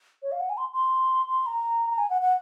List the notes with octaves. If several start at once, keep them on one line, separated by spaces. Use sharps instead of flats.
C#5
F5
F#5
G#5
C6
C6
C6
A#5
A#5
G#5
F#5
F#5